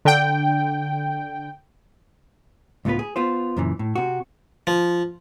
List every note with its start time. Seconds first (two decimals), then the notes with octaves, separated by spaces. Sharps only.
0.05 D3 G5
2.85 C#2 A2 B3 F4 B4
2.99 G#4
3.16 B3 F4 C5
3.57 F#2 A#2 C#3 E3
3.79 A2
3.96 C3 F#4
4.67 F3